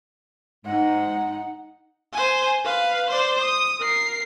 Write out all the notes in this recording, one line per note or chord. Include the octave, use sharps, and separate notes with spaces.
G#2 G#3 D#4 F#5
C5 G#5
B4 F5
C5 D5
D#6
A#4 C7